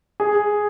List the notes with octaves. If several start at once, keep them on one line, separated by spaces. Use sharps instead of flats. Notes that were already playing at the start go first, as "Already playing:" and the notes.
G#4